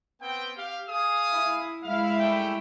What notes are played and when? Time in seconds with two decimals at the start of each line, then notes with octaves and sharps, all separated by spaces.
0.21 B3 C4 G5
0.56 G4 F5
0.88 G#4 F5 D#6
1.33 E4
1.83 G#3 E4 F5
2.19 G3 A3 G5